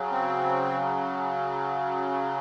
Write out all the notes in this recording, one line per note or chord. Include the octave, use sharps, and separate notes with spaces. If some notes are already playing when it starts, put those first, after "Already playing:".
Already playing: C#3 F#3
C4